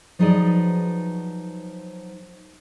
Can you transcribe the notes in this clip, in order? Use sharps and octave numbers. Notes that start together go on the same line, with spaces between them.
F3 F#3 D#4 G#4 B4 D5